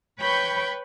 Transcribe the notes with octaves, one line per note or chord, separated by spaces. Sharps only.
B4 C#5 G5 B5 C#6 G6